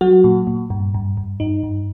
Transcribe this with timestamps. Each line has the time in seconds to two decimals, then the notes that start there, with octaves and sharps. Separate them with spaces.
0.01 F#3 F#4
0.24 A#2
0.47 A#2
0.70 G2
0.94 G2
1.17 G2
1.40 G2 D#4
1.63 G2